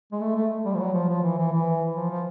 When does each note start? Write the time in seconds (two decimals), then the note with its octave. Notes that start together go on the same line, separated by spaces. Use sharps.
0.12 G#3
0.21 A3
0.36 A3
0.65 G3
0.74 F3
0.80 F#3
0.94 F3
1.09 F3
1.24 E3
1.38 E3
1.52 E3
1.96 F3
2.11 F3